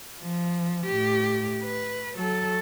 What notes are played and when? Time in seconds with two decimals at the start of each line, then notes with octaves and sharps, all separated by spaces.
0.21 F3
0.86 A2 G4
1.62 B4
2.15 F#3 A4